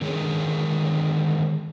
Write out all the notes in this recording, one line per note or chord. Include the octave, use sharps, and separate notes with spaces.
D3 D#3 G#3 G#4 A#4 C#5